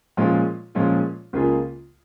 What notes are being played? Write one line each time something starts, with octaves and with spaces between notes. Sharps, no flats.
A#2 F3 G#3 C#4 F4
A#2 F3 G#3 C#4 F4
C#2 C#3 A#3 F4 G#4